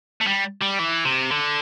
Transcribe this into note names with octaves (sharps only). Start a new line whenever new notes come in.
A3
G3
G3
E3
C3
D3